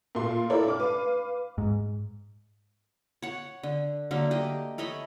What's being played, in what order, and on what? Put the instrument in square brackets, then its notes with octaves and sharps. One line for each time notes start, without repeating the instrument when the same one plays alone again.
[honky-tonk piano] A#2 A3 F4 C6
E4 A4 A#4 C#5 D5
D4 D6 F6
B4 F5
[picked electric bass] G#2
[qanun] C#5 F#5
D3
D3 F#3 A3 A#3
G4 D#5
A3 C#5 D#5 B5